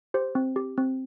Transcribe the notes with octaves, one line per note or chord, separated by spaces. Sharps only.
G4 C5
C4
G4
C4